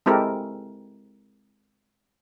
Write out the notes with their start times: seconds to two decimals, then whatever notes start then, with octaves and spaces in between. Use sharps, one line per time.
0.06 G#3 C4 E4 G4 A4 A#4